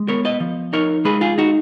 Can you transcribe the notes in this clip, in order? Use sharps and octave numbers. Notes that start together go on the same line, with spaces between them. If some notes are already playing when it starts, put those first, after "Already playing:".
Already playing: G#3
B3 A#4 C#5
B4 D#5
F3
D#4 A#4 C#5
G#3 G#4 B4
F4 G#4
D#4 F#4